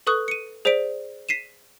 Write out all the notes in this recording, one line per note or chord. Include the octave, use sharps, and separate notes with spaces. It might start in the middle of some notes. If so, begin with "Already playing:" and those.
A4 B4 C#6 D#6 F#6
C#7 D#7
G#4 C5 D5 B6 D7
B6 C7 D#7 E7